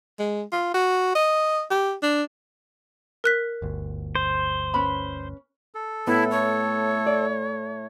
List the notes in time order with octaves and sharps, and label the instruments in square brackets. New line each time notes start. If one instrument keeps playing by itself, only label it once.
[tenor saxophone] G#3
F4
F#4
D#5
G4
D4
[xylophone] A#4 F#6 B6
[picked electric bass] G1 D2
[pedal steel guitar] C5
[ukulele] C#4 B4 B5
[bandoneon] A4
[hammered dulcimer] A2 [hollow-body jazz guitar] B3 [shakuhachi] E4
[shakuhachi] C#5
[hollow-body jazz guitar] D5